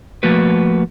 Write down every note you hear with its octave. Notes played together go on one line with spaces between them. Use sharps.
F3 A3 A#3 F#4 B4